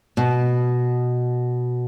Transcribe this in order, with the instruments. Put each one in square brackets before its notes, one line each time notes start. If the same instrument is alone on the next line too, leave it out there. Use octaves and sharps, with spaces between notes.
[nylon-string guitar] B2